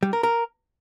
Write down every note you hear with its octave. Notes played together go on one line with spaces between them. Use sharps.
G3
A#4
A#4